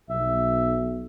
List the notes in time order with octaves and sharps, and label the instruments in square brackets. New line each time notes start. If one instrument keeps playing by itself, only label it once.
[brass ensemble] B1 [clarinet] E5